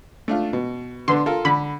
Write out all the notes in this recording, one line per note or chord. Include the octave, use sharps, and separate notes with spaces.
A3 D4 F4
B2
D3 B3 D4 C6
F4 A4 A#4
D3 B5